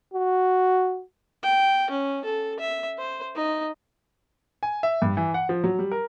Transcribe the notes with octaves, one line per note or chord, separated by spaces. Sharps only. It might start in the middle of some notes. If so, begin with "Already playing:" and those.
F#4
G5
C#4
A4
E5
C5
D#4
G#5
E5
G2
E3
F#5
F3
F#3
G3
A#4